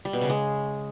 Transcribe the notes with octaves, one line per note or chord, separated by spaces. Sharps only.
G3
B2
C#3
G#3